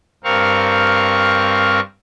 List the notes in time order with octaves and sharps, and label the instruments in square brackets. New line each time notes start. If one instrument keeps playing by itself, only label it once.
[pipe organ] G2 C4 A#4 F5 C#6